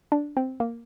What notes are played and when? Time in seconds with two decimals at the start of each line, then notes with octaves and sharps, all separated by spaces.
0.12 D4
0.37 C4
0.60 A#3